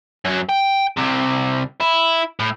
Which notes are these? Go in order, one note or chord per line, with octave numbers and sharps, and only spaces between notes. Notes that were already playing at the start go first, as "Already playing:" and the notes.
F#2 F#3
G5
C2 C3
E4
A2